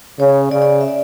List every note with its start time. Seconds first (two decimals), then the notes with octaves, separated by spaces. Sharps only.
0.19 C#3 C#5
0.51 C#3 D5
0.62 D5
0.81 E5
0.88 D5